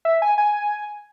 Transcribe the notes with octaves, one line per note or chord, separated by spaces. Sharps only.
E5
G#5
G#5